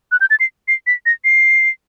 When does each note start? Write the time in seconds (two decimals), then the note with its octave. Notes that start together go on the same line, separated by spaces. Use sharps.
0.12 F#6
0.21 G6
0.30 A6
0.40 C7
0.68 C7
0.87 B6
1.06 A#6
1.25 C7